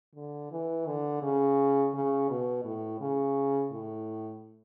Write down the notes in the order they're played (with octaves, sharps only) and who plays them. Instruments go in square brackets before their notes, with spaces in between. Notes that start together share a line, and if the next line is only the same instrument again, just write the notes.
[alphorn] D3
E3
D3
C#3
C#3
B2
A2
C#3
A2